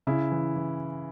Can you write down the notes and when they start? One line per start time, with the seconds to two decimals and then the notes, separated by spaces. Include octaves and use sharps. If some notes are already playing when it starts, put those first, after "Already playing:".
0.07 C#3 E4
0.32 E3
0.56 E3